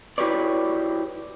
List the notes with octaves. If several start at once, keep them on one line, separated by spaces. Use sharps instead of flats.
E4 F#4 G4 B4 C#5 D5